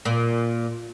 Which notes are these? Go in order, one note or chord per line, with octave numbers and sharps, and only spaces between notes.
A#2